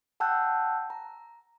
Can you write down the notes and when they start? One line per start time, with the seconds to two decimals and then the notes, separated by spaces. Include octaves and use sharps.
0.20 F#5 G5 A5 E6 F#6 G6
0.90 A#5